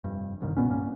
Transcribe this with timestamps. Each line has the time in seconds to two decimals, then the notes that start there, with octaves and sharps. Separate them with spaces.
0.04 F1 G2
0.41 F#1 C2 G2 D#3
0.57 A#2 B3 C#4
0.70 G2 A#3 C#4